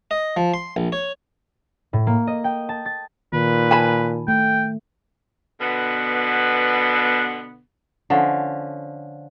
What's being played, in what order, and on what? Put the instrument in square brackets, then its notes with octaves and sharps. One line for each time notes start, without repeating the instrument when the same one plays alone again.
[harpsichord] D#5
F3
C6
A#1
C#5
[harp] A2
A#3
D#5
G5
A5
A6
[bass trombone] A#2 [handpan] D#3 [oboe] B4
[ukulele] G#5 A5 B5
[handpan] A3 [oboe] G5
[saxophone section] B2 D3 B3
[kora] D3 F3 C#4